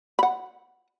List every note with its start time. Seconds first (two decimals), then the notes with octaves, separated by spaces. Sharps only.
0.19 F#5 B5